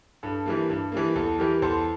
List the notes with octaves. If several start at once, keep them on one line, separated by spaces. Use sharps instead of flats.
G2 A4
E3 G3 A#3
G2
E3 G3 A#3
E2 A4
E3 G3 G4 A#4
E2 A4 C5